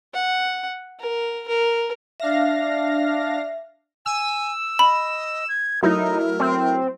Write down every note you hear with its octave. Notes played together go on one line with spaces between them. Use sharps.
F#5
A#4
A#4
D4 E5 F5 A#6
G#5 E6
D#5 B5
G#6
F#3 A3 D#4 E4 A#4
C4